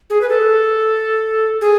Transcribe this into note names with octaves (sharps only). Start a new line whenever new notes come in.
G#4
B4
A4
G#4